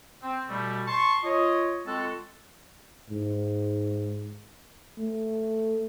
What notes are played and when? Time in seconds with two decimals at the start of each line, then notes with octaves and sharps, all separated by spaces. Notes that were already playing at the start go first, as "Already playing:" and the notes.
0.22 C4
0.48 B2 G3 A3
0.87 A5 C6 C#6
1.24 F4 C#5 D#5
1.86 G#3 C4 F4 F#4 A4
3.10 G#2
4.98 A3